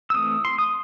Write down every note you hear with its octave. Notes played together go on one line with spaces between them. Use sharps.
E6
E3 A3 C4 D#6
C6
D#6